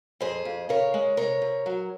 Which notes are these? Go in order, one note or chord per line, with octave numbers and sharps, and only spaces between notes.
F2 G#4 C5
F2
C#3 A#4 C#5
G#3
C3 A#4 C#5
C3
F#3